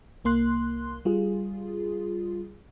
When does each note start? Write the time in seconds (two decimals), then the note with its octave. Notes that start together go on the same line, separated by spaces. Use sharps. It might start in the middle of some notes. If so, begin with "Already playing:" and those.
0.25 C2 A#3 C6 F#6
1.05 G3 F4 G#4